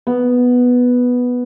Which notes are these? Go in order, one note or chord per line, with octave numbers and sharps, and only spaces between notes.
B3